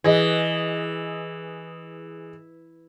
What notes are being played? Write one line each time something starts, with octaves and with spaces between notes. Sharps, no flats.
E3 G#4 D#5